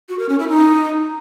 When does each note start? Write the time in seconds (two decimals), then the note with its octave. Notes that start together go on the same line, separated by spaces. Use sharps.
0.09 F#4
0.19 A#4
0.29 C#4
0.39 E4
0.49 D#4